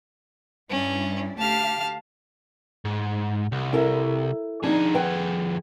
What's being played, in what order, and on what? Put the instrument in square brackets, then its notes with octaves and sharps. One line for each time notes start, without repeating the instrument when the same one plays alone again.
[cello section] G2 D4 E4 [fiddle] C#4
[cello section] D2 G4 F5 [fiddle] A5 F6
[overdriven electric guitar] G#2
C2
[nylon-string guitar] E4 A4 A#4
[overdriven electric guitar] F2 G#4 [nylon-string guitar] D4 D#4
[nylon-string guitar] B4 F#5 G5